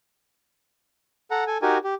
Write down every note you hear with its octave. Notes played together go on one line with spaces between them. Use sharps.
A4 F#5 A#5
A4 G#5
D#4 F#4 G4 A#4 G#5
G4